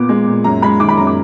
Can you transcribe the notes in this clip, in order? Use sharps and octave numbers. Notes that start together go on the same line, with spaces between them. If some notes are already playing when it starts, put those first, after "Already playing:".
Already playing: A#2 B3 D6
G#3
A#2
F#2 A#5
G#3 B5
D#3 D6
B5
F#2 A#5
D6